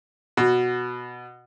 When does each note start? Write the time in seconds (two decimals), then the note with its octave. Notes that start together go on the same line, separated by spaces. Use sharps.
0.37 B2